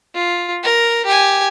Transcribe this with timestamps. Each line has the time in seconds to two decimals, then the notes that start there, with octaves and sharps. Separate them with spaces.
0.15 F4
0.63 A#4
1.06 G4 G#5